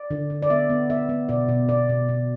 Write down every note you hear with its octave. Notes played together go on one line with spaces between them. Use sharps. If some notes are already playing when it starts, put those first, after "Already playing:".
Already playing: D5
D3
D3
D5
B3 E5
B3
B3 E5
B3
B2 D5
B2
B2 D5
B2
B2